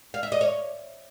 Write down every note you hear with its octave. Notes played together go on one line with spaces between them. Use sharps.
F5
E5
D#5
C#5